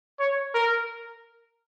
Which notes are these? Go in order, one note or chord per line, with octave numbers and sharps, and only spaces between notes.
C#5
A#4